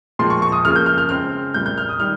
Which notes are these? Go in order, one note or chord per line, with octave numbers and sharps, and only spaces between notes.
A#2 F3 G#3 C4 C6
C#6
C#6
D#6
C#3 F3 A#3 F6
G6
F6
F6
C#3 G#3 C4 F6
A#2 G3 A#3 G6
G6
F6
D#6
D#3 G3 F6